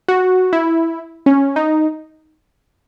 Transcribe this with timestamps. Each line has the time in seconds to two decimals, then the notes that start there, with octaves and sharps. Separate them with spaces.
0.08 F#4
0.53 E4
1.26 C#4
1.56 D#4